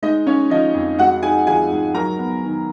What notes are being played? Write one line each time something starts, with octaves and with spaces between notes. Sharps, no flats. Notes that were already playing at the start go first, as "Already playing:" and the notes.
G#3 D#4 D#5
C#4 C#5
F3 D#4 D#5
F2
G#3 F#4 F#5
D#4 G#4 G#5
F3 G#4 G#5
G#2
F#3 A#4 A#5
B3
D#3